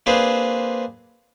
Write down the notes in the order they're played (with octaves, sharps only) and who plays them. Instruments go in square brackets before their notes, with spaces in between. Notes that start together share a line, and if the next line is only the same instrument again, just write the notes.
[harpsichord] A#3 C4 D4 G#4 B4 C5